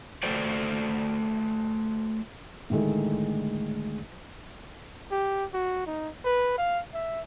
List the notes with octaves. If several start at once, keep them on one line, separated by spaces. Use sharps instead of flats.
A3 F#4 A4 C5 D5 G5
A2 D3 D#3 G#3 A3
G4
F#4
D#4
B4
F5
E5